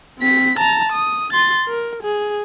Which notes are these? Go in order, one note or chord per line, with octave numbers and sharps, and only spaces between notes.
C4 B6
A5 A#5
D#6
C6 A6
A#4
G#4